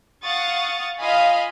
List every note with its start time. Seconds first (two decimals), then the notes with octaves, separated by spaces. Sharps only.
0.23 F5 F#5 C#6 D#6 A6
1.02 F4 D#5 F5 G#5 B5